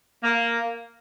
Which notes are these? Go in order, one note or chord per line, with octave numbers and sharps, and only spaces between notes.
A#3